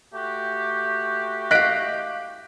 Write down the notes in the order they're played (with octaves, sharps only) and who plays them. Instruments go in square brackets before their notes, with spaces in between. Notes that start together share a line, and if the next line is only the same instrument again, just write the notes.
[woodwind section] A3 F#4 G4
[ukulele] D#5 F5 [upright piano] F#6 B6 D7